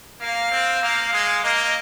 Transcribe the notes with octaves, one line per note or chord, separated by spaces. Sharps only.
A#3 F5
C4
A#3 F5
G#3
A#3 D#5